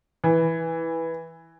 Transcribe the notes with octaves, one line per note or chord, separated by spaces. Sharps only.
E3